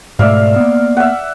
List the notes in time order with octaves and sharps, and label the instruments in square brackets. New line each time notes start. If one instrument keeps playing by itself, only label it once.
[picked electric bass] G#2 B2 A3 [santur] D5 E5 F5
[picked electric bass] A#3 B3
[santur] E5 F#5